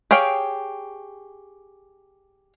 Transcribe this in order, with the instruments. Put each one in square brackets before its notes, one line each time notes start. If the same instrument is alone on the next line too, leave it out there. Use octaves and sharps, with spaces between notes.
[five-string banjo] G4 G#4 C#5 F5 G5